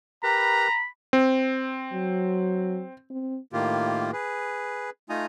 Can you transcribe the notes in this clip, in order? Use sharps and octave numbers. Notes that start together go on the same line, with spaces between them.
G4 A#4 B4 A#5 B5
C4
F#3
C4
A2 D#3 A#3 F4 G4
G#4 B4
A3 D#4 F4 G#5 A#5 D#6